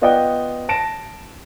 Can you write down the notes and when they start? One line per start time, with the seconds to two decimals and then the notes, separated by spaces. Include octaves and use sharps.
0.01 B3 F4 D5 D#5 F#5 G5
0.69 A5 A#6 D7 E7